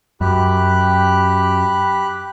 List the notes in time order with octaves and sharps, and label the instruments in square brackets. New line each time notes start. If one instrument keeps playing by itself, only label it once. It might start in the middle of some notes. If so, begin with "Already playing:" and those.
[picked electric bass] F#2 [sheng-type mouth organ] G4 B5 F#6